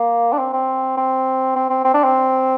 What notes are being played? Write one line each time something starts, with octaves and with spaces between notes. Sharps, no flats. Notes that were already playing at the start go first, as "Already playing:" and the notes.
Already playing: A#3
D4
C4
C4
C4
C4
C4
C4
D4
C4